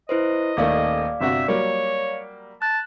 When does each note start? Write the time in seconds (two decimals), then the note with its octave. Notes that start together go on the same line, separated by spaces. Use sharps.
0.09 E4 B4 C5 D#5
0.57 D#1 D#3 A3 D5 F5 D6
1.21 G1 C3 F#4 E5
1.48 F#3 G3 A#3 C#5
2.62 A5 F#6